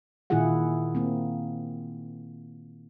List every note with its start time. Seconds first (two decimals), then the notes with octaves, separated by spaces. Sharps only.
0.30 A#2 D#3 E4 F4 G#4 F#5
0.95 A#3 C4